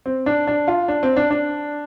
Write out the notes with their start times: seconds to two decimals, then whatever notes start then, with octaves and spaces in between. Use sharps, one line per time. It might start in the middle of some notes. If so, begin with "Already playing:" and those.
0.06 C4
0.26 D4
0.47 D4
0.68 F4
0.88 D4
1.03 C4
1.16 D4
1.31 D4